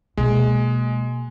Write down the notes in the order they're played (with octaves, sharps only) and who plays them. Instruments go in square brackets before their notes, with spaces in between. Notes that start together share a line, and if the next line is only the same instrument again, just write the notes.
[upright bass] B2 A#3 [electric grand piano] G#3